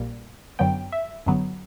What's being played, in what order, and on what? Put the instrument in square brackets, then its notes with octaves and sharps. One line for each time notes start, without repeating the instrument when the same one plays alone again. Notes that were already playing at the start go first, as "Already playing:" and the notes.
Already playing: [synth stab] A#1 A#2 G3 A#3
G1 F#2 D3 F#3 B3 G5
E5
G1 F#2 D3 F#3 B3